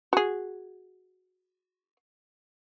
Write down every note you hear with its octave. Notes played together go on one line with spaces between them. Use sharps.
F#4 G#4